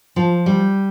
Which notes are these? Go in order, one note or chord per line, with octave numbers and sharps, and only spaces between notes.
F3
G3